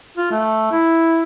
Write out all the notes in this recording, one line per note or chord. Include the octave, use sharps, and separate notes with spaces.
F4
A3
E4